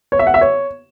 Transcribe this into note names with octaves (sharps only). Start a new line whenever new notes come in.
C#5
E5
F#5
E5
C#5